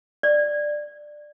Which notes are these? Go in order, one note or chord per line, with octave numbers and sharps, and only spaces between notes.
D5